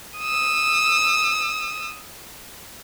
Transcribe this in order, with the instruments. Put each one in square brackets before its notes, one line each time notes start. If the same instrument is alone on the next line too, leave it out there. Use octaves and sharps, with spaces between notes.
[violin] D#6 E6